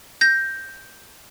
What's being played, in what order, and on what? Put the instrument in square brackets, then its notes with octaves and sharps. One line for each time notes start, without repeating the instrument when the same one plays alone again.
[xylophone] G6 A#6